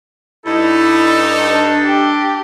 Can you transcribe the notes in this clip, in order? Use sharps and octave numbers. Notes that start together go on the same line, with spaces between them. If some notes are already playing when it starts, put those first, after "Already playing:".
G2 D#4 E4 A4
D4
G4